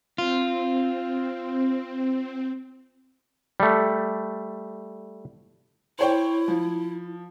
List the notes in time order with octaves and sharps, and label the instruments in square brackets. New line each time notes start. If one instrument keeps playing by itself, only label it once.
[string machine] C4 [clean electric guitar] F4
[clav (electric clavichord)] G3 A3
[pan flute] E4 [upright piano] C5 C#5 G5
[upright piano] F3